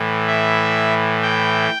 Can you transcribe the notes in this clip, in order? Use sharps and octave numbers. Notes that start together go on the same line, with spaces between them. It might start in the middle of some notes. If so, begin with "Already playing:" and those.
Already playing: A2 E3
E5
G5